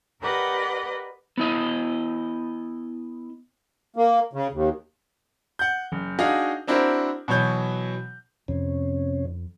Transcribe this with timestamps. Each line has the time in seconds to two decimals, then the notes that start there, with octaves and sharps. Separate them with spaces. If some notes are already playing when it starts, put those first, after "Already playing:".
0.21 G4 A#4 B4 D5 D#5 F#5
1.38 B3 E4 D#5
3.96 A#3
4.33 C#3
4.52 D#2
5.59 F#5 G6
5.92 F#1
6.19 D4 D#4 F#4 G#4 D#5 F5
6.67 C4 D4 E4 F#4 A#4 C5
7.28 B2 E3 F#3 C#5 G6
8.48 F2 C3 C#4